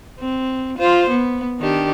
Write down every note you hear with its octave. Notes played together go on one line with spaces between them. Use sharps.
C4
F4 C5
B3
D#3 D4 G4